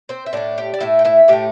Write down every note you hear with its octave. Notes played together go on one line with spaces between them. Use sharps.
C4 C5
E5
A2 A3 D4 D5
G4 G5
D5
A2 A3 E4 E5
G5
E4 E5
A2 A3 G4 G5